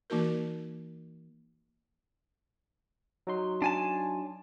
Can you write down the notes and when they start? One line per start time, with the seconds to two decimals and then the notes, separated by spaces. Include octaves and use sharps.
0.10 E3 A#3 D#4 F#4 A#4
3.27 F#3 D#4 C6
3.62 D4 G#5 A5